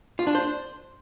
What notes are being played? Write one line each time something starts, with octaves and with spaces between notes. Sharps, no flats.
F4
D4
C5